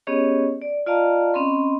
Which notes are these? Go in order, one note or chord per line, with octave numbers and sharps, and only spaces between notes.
B3 C#4 G4 G#4 C#5 D#5
D5
F4 D5 D#5 F5 A5 A#5
C4 C#4 D#5 B5 C6